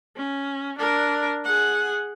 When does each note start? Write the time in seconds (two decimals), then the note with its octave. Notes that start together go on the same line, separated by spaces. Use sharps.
0.16 C#4
0.79 D4 A#4
1.45 G#4 F#5